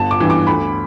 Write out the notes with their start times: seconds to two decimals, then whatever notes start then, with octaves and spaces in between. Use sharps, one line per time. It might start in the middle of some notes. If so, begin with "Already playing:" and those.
Already playing: G1 A5
0.11 D6
0.20 G2 E3
0.30 D6
0.47 D2 B5